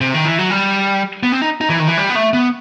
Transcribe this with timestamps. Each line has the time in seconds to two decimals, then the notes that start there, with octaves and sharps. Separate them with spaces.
0.01 C3
0.14 D#3
0.25 E3
0.39 F#3
0.50 G3
1.23 B3
1.32 C4
1.42 D#4
1.61 D#4
1.70 E3
1.79 D#3
1.88 E3
1.97 G3
2.10 B3
2.15 A3
2.33 B3